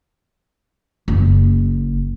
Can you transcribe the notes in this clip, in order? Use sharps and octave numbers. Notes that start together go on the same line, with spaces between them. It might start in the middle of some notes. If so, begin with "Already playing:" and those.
F#1